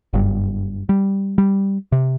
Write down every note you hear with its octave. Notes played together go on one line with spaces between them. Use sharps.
F#1 G2
G3
G3
C3